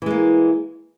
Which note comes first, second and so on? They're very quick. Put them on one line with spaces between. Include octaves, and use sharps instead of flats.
E3 G#3 A#3